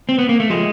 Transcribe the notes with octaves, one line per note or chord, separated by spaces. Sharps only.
C4
B3
A#3
A3
F3 G#3